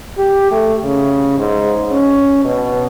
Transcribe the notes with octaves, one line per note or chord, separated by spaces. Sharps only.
G4
A3
C#3
G#2
C#4
B2